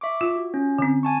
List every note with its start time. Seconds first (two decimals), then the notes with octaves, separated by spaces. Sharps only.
0.01 E5 C#6 D6
0.21 F4
0.36 F#4
0.54 C#4
0.79 D3 C4
1.03 G#5 A5 C#6